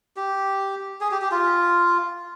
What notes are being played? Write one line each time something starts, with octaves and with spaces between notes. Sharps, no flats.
G4
G#4
G4
G4
F4